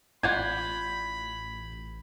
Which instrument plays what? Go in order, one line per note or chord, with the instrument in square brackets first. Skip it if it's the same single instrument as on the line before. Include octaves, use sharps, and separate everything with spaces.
[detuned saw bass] A1 [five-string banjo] F4 D5 F#5 [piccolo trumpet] B5 [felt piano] G6 G#6